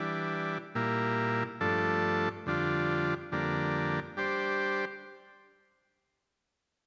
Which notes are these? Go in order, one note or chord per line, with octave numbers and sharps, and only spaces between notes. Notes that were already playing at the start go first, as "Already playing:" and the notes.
Already playing: E3 G3 D4
A#2 G3 A#3 E4
G2 F3 A3 D4 A4
F2 D3 G3 D4 F4
F2 D3 G3 A#3 D4
G3 D4 G4 C5